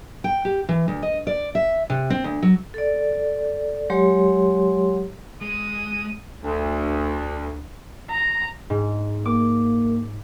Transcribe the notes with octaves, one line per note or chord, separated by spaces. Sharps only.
G5
G4
E3
D2
D#5
D5
E5
C3
C4
D2
F#3
A4 D5
F#3 G#3 G4 C#5 C6
G#3 D#6
D2
A#5
G#2
A#3 D6